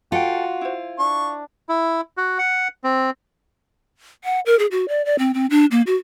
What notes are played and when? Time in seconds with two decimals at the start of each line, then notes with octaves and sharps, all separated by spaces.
0.12 F4 F#4 A4 F#5 G5
0.61 E4 C5
0.99 D4 C#6
1.69 E4
2.17 F#4
2.39 F#5
2.84 C4
4.24 F#5
4.46 A#4
4.59 G#4
4.71 F#4
4.88 D5
5.05 D5
5.19 C4
5.34 C4
5.50 D4
5.71 A#3
5.87 F#4